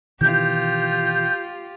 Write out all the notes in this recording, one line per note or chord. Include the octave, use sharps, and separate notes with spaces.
B2 D#3 E3 F4 G4 G6